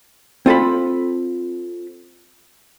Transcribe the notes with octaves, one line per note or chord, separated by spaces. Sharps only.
C4 F4 A4 B5